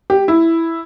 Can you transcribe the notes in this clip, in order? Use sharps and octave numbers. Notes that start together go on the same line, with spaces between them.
G4
E4